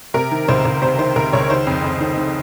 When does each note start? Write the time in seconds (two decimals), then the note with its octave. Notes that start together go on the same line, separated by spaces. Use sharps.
0.14 C3 A#4
0.31 D#3
0.48 C#2 C5
0.65 C#2
0.82 C3 C5
0.99 D#3 C5
1.16 C#2 A#4
1.33 C#2 C#5
1.50 D#3 C5
1.67 F2
1.84 F2
2.00 D#3
2.18 D#3